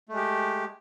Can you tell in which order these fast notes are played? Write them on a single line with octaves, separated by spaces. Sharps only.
A3 G#3 G4